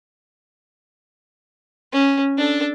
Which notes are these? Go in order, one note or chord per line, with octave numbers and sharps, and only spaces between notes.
C#4
D4 A4